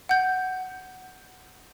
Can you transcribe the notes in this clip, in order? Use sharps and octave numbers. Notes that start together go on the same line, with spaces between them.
F#5 G6